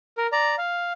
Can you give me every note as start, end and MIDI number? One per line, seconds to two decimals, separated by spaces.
0.18 0.27 70
0.32 0.55 74
0.32 0.55 82
0.58 0.93 77